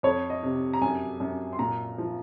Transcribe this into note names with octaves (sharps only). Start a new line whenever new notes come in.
F2 C#5
D#5
C3
A#5
F#2 G#5
F#2
C6
A#2 A#5
F3